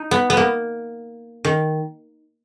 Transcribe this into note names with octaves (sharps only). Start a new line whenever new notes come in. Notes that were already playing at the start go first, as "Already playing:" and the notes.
Already playing: D#4
B3
B3
A#3
D#3